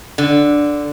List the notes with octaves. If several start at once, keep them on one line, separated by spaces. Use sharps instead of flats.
D3